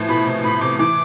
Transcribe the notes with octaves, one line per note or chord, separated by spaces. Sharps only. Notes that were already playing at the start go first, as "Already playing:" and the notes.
Already playing: A2 E3 F3
B2 B5
C3
A2 B5
C3 D6
E3 D6